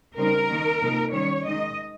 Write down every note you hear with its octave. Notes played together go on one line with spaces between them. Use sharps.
C#3 G3 C4 D#4 A#4
D#3 A#3 D#4
C3 F3 A#3 D#4
D#3 G3 C#4 C#5
D#3 G#3 D#4 D#5